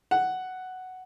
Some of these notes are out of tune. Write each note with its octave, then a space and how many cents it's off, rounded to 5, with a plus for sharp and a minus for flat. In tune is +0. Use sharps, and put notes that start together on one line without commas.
F#5 +5